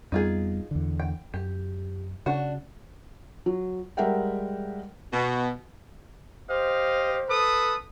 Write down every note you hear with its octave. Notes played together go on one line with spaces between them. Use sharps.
F2 G3 B3 D#4 F4 G#4
E2 D3
G5
F#2 G4
C#3 D4 F#4
F#3
G3 G#3 A#4 E5 F#5 G5
B2
G4 C5 D#5 F5
A4 B4 D#6